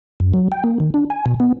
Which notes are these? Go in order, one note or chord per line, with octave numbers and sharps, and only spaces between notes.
F#2
F#3
G5
A#3
D#3
D4
G#5
B2
B3